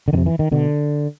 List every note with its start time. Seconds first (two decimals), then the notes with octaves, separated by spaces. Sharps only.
0.08 D3
0.13 F2 D#3
0.17 C3
0.26 E3
0.39 D#3
0.52 B2 D3